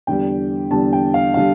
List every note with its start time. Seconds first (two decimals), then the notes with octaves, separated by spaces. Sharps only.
0.07 E2 D3 G3 G5
0.71 E2 D3 G3 A5
0.93 G5
1.14 F5
1.34 D3 G3 F5